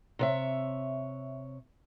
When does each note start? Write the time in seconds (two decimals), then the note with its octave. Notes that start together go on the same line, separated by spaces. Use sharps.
0.19 C3 C#5 E5